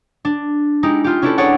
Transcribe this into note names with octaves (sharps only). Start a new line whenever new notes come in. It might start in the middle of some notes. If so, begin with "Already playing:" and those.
D4
G#3 D#4 E4 G4
F4 G4
C#4 D4 E4 G4 A4 B4
G#4 C#5 D5 F#5